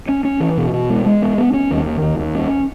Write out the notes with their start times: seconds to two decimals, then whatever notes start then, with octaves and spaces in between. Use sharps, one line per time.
0.08 C#4
0.24 C#4
0.40 E3
0.57 B2
0.73 B2
0.90 G#3
1.06 G#3
1.22 B3
1.38 B3
1.54 C#4
1.71 D#2
1.86 D#3
2.02 D#2
2.19 D#2
2.35 C#4